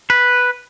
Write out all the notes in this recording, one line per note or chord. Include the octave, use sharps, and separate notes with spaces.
B4